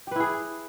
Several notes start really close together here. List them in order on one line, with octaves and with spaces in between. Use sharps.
G4 B4 E4 G#4